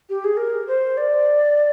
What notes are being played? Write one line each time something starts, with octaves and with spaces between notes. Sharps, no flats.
G4
G#4
A#4
C5
D5